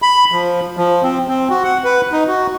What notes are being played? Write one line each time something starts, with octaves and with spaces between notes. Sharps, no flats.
B5
F3
F3
C4
C4
F#4
F#5
B4
D#4
F#4